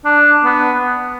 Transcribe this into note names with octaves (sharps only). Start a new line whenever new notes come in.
D4
B3